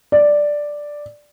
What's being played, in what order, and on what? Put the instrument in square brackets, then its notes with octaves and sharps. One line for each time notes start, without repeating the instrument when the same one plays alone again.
[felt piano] D5